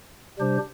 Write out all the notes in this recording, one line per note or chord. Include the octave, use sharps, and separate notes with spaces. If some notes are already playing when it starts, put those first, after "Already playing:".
C3 G3 D4 G4 C5